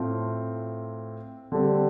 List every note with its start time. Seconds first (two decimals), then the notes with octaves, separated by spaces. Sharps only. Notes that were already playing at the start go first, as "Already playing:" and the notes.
Already playing: A2 A3 C4 F4
1.52 D3 G3 C4